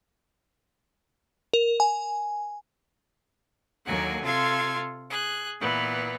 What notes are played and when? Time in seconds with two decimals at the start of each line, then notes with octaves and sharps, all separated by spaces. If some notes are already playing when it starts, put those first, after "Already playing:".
1.54 A#4
1.80 G#5
3.86 D#2 D3 F#3 A#3 F#5 G#5
4.22 C3 F4 A4 F5 C6 G#6
5.10 G#4 F#6
5.60 A#2 E3 B3